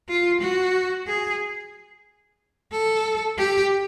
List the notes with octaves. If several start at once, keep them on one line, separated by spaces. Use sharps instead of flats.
F4
F#4
G#4
A4
G4